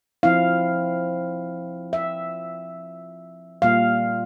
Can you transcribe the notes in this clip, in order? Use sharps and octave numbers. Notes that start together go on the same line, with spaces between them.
F3 C4 E4 F5
E5
A#2 G3 A#3 F4 F5